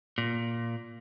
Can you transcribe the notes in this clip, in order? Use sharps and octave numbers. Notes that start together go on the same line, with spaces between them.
A#2